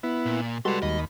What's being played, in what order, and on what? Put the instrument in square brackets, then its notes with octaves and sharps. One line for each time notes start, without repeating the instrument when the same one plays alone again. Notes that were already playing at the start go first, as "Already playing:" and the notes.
[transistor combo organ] B3 E4
[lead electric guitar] A#2
[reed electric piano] G3 G#3 F#4 [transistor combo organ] A4 B4 [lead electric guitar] D5 C6
[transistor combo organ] D#2 B5 [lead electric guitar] D#5